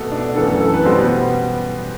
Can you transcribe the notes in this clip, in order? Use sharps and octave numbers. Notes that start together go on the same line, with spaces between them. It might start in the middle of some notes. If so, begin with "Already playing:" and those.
Already playing: B2 A3 A4
D4
F#2 E3 A3 A4
A4
A4
B4
B2 G3 B3 C5